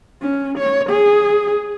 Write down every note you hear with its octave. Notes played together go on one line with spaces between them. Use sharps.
C#4
C#5
G#4